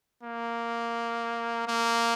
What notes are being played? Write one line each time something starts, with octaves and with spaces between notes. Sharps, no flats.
A#3
A#3